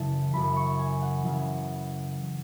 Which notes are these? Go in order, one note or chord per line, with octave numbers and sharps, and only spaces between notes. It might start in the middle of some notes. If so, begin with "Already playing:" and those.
Already playing: F#2 C#3 E3 A5
F#2 C#3 E3 B5
C#6
G#5
F#5
F#2 C#3 E3